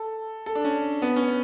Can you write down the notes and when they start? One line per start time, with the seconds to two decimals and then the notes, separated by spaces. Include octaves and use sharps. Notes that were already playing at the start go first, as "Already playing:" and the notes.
Already playing: A4
0.46 A4
0.55 D4
0.64 C#4
1.02 B3
1.16 C#4